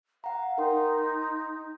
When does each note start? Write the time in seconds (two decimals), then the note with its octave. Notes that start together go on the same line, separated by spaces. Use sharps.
0.24 F5 F#5 A#5
0.58 D#4 A#4 G5 C6
0.98 C6